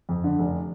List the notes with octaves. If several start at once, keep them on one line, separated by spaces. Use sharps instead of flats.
F2
D3
F1